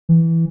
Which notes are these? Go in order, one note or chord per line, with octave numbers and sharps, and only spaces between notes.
E3